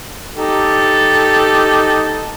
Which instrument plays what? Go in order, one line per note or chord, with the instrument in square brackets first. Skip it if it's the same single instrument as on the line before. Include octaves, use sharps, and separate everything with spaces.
[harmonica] D#4 G4 A4